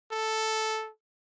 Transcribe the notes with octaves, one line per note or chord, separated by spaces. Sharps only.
A4